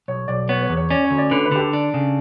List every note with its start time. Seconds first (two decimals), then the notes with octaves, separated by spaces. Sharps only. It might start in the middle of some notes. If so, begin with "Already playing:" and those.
0.08 B1 C#5
0.28 B1 D5
0.49 B3 C#5
0.63 C#5
0.69 E2
0.77 C#5
0.90 C#4 D5
1.04 C#5
1.11 D2
1.18 D5
1.31 D3 B4
1.45 B4
1.52 D3 G4
1.58 A4
1.73 D4
1.94 C#3